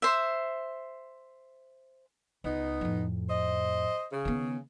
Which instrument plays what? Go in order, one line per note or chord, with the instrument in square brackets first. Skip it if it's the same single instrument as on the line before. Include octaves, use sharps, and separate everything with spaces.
[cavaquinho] C5 E5
[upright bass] C#2 [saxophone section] B3 D#4
[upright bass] F2 A2
[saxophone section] C5 D#5
C#3
[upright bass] D#3 B3